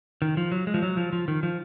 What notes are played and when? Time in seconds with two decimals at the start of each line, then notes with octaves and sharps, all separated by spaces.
0.22 D#3
0.37 F3
0.52 F#3
0.67 G#3
0.74 F3
0.82 F#3
0.97 F3
1.12 F3
1.28 D#3
1.43 F3